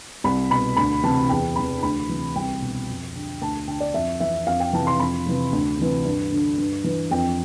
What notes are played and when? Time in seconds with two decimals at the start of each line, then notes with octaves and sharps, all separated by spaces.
0.24 C2 B5
0.50 B2 B5
0.77 D2 B5
1.03 C3 E3 A5
1.29 E2 G5
1.56 C3 E3 B5
1.83 D2 B5
2.09 C3 E3
2.36 C2 G5
2.61 B2
2.88 F2
3.15 D3
3.41 D2 A5
3.67 D3 G5
3.80 D5
3.94 F2 E5
4.20 E3 E5
4.47 F2 F5
4.60 G5
4.73 C3 E3 A5
4.87 C6
4.99 F2 B5
5.26 C3 E3
5.52 D2
5.78 C3 E3
6.05 G2
6.32 D3
6.58 G2
6.84 E3
7.11 F2 G5